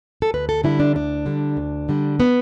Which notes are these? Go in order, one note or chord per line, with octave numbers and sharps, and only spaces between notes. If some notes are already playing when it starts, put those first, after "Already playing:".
A4
D2 B4
A4
D3 G3 E4
D4
D2 D4
D3 G3
D2
D3 G3
B3